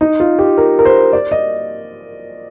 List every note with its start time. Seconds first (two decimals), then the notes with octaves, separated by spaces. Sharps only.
0.01 D#4
0.20 F4
0.39 G4
0.57 A#4
0.79 A#4
0.85 C5
1.13 D5
1.31 D#5